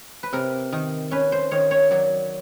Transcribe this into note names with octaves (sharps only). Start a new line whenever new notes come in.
B4
C3 A#4
D#3
C#4 B4
C5
D#3 C#5
C#5
F#3 D5